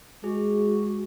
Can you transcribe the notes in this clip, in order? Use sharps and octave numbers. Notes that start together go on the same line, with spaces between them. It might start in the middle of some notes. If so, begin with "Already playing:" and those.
G#3 F#4 G#4